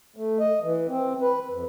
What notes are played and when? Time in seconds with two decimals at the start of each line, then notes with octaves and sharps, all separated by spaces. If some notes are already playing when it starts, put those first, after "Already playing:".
0.16 A3
0.39 D#5
0.63 E3
0.89 C4
1.21 B4
1.50 F2